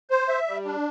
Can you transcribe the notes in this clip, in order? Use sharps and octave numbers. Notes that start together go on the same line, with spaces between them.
C5
E5
G3
D4